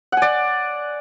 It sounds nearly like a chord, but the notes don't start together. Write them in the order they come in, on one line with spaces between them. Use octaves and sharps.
F#5 G#5 D5